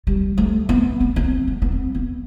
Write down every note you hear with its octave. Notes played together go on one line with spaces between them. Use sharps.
G3
A3
B3
B3
B3
C4
B3
B3
C4
B3